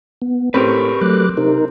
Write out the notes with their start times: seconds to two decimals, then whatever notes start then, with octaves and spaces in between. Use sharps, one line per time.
0.22 B3
0.54 A2 C4 G4 A#4 B4 C#6
1.01 F#3 A3 D6 F#6
1.37 C3 D#4 A#4